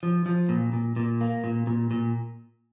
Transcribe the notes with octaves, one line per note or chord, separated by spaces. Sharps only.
F3
F3
A#2
A#2
A#2
A#3
A#2
A#2
A#2